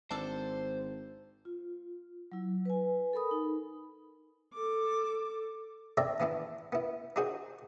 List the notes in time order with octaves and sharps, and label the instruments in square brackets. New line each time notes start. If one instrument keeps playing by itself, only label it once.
[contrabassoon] G#1 [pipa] D4 A4 [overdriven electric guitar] C5
[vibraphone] F4
F#3 E4
B4 G#5
A4 A#4 B5 D#6
D#4
[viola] A4 D6
[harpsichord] C4 A4 C#5 D5 E5 A#5
E3 B3 D4 E4
B3 E4
D4 D#4 F#4 G#4 C5